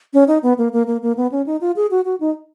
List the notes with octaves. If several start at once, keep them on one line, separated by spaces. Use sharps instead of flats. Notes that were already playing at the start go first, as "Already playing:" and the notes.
C#4
D#4
B3
A#3
A#3
A#3
A#3
B3
C#4
D#4
F4
G#4
F#4
F#4
D#4